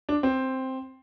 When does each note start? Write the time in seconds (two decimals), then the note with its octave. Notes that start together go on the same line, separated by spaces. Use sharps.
0.09 D4
0.23 C4